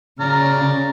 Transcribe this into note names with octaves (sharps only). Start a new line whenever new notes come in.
C#3 D5 A#5 F6